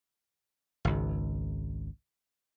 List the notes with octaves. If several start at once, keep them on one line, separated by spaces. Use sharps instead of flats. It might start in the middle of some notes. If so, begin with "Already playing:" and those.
G#1 C#2